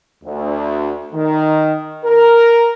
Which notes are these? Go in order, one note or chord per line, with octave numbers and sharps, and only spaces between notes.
D2
D#3
A#4